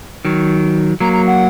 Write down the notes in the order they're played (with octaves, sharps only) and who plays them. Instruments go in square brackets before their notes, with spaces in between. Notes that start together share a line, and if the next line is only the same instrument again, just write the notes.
[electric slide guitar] D#3 F#3
[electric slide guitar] F#3 A#3 [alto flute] A#5
[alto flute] A#5
F#5